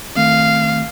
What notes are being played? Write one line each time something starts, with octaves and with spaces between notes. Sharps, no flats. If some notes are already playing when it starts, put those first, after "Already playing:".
D#3 A3 C4 F5